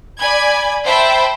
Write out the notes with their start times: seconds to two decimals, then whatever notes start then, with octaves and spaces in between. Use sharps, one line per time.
0.20 D5 G#5 B5 G#6
0.86 C5 E5 G5 A5 B5